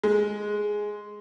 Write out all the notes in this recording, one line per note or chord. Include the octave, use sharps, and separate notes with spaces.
G#3